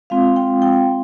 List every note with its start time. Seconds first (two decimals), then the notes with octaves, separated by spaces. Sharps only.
0.10 G#3 C4 F4 F5
0.36 G5
0.62 G5